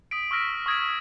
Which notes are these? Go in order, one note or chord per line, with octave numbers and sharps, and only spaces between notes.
D#6 B6 D7
C#6 E6 F6 A#6 B6 D7
C#6 D#6 G#6 A#6 D7